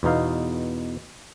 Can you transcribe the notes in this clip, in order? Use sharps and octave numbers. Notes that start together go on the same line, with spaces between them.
E2 B2 D#4 F5